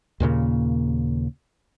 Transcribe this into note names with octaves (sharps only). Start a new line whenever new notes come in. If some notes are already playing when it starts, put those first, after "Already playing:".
D#2 A#2 C#3 A#3